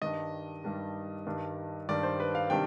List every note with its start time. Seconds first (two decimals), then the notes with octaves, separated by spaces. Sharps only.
0.01 G2 D#3 G3 D4 D#5
0.64 G2 D#3 G3 D4
1.26 G2 D#3 G3 D4
1.89 G2 D#3 G3 D4 D5
2.03 C5
2.20 B4
2.35 F5
2.50 C3 D#3 G3 D4 G5